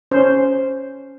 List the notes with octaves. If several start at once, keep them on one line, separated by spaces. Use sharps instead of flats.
C#4 C5